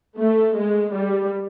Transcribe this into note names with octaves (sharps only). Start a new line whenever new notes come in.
A3
G#3
G3